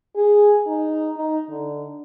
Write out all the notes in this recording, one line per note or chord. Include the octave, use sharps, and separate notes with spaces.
G#4
D#4
D#4
D3